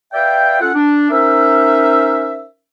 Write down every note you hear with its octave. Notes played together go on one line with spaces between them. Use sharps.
B4 D5 E5 F5 G5
C#4 F4 A4 F#5
D4
C#4 D#4 A#4 C5 E5